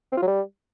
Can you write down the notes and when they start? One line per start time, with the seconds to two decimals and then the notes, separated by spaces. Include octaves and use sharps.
0.12 C4
0.17 F4
0.22 F#3
0.27 G3